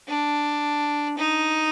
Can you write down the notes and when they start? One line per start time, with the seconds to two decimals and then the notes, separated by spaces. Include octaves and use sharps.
0.08 D4
1.18 D#4